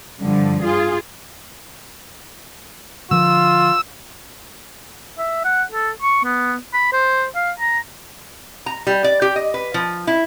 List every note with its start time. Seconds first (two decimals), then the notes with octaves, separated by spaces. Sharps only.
0.20 G2 D3 F3
0.63 F4 G#4
3.11 D3 F3 F4 E6
5.18 E5
5.45 F#5
5.72 A4
6.02 C#6
6.24 B3
6.74 B5
6.93 C5
7.35 F5
7.59 A#5
8.66 A#5
8.87 G3
9.04 D5
9.22 G4
9.36 D#5
9.54 B4
9.74 F3
10.07 E4